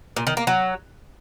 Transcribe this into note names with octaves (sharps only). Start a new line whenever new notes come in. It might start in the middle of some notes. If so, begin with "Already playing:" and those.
A#2
D#3
A#3
F#3